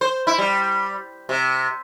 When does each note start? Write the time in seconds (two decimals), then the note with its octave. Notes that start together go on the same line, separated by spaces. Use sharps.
0.01 C5
0.27 E4
0.38 G3
1.29 C3